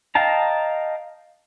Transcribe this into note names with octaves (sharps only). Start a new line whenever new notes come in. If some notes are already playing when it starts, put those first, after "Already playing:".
D#5 F5 G5 A5 A#5